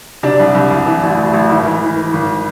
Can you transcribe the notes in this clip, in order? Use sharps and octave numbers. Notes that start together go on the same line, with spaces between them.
C3 D4
C2
C2
C2
E3
A1
A1
A1
G#1 E4
E3
E3
E3
G#1